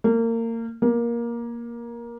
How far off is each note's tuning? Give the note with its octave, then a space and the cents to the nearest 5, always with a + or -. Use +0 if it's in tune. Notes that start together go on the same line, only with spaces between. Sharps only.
A#3 -30
A#3 +15